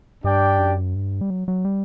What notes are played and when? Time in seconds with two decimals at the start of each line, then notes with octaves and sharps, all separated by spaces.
0.23 G2 D4 G4 D5 G5
0.59 F#2
0.95 G2
1.21 G3
1.30 F#3
1.48 F#3
1.65 G3